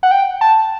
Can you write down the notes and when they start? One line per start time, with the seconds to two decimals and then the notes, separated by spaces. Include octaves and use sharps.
0.03 F#5
0.11 G5
0.41 A5